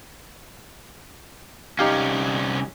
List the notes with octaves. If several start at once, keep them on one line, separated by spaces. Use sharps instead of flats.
C2 C#4 D#4 G4 F5